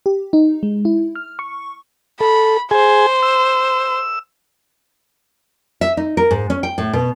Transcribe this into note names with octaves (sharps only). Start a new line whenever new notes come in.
G4
D#4
G#3
E4
F6
C#6
A4 B5
G#4 C5 G#5
E6
E5
D#4
A#4
G#2
C#4
G5
A2
B2